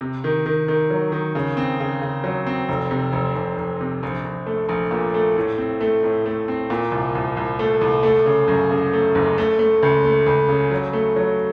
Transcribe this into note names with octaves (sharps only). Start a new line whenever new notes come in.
C3
D#3
D#3
D#3
F#3
D#3
C#3
C4
C#3
C#3
F#3
C4
F1
C3
F1
F1
F1
C3
A#1
A#1
A3
A#1
A#2
A3
A2
C4
A3
A2
A3
C4
A#2
C2
C2
C2
A3
C2
A3
C#3
F#2
C#3
A3
F#1
A3
A3
C#2
A3
C#2
C#3
F#3
A3
F#3